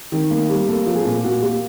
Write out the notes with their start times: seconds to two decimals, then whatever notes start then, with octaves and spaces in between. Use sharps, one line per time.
0.12 D#3
0.30 A#3
0.49 G3
0.68 A#3 A4
0.86 F3
0.96 G#4
1.05 A#2
1.24 A#2 F#4
1.42 A#3 G4